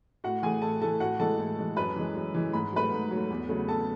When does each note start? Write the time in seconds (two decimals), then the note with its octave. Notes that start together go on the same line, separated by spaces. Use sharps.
0.24 A2 F#4 F#5
0.42 E3 A3 G#4 G#5
0.62 A2 A4 A5
0.81 E3 A3 A4 A5
1.00 A2 F#4 F#5
1.19 E3 G#3 A4 A5
1.39 A2
1.58 E3 G#3
1.76 F#2 B4 B5
1.96 E3 G#3
2.15 F#2
2.34 E3 G#3
2.53 G#2 B5
2.72 F#3 A3 B4 B5
2.92 G#2
3.11 F#3 A3
3.30 E2
3.49 C#3 F#3 A3
3.68 E2 A4 A5